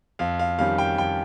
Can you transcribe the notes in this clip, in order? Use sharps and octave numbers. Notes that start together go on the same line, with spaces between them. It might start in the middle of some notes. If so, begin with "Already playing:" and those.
F2 F5
F5
D#3 G3 C#4 F5
G5
F2 G5